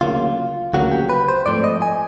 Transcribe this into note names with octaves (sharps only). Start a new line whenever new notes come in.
D2 C#3 F#3 A#3 F4
D2 C#3 F#3 A#3 F#4
G4
B4
C5
G#2 F3 A3 C4 D5
D#5
G#5